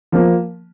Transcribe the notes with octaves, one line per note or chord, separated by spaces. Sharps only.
F3 A#3